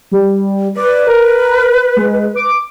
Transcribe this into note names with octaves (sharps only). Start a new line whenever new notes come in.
G3
B4 D5
A#4
G#3
D6